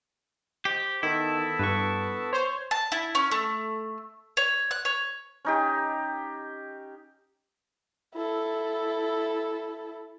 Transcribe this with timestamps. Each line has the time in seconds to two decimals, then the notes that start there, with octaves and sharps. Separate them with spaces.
0.65 G4 C5 D#5
0.86 C5
1.03 D#3 B3 E4 A4 A5
1.59 G2 B4 C#6
2.33 C5 C#5
2.71 A5
2.92 E4
3.15 C#4
3.32 A3
4.37 C#5
4.71 F#6
4.85 C#5
5.45 C#4 D#4 G4
8.14 E4 A4